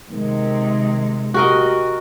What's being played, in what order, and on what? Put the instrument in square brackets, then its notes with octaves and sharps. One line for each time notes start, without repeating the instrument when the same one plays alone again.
[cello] C3 G#3 [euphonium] D#3
[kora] F#4 A#4 D#5 [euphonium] G4